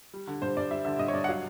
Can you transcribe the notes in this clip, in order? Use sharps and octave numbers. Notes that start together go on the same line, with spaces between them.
G3
D3
G2 C5
G2 D5
G3 E5
D3 E5
G2 D#5
C#5
G2 D5
F#5
F#3 F5